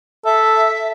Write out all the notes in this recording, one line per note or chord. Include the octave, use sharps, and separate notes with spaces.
A4 E5